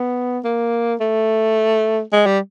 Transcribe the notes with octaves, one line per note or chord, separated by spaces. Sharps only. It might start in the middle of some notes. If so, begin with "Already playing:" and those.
Already playing: B3
A#3
A3
G#3
G3